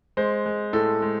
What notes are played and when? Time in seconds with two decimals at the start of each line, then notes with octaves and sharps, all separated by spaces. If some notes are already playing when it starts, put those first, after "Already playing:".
0.17 G#3 C5
0.46 G#3
0.73 A2 A4
1.02 G#3